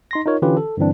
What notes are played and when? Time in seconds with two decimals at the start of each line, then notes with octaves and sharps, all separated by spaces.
0.11 D#4 C6 A#6
0.26 D#4 F4 A#4 C#5
0.42 D3 E3 C#4 F4 G4 B4
0.57 A4
0.77 G2 D3 E3 C4 D4